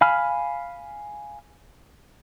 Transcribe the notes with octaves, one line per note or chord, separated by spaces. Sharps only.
F5 G#5 B5 F6